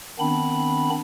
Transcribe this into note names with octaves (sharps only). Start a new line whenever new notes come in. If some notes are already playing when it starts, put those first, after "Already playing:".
D#3 B3 C4 D4 B5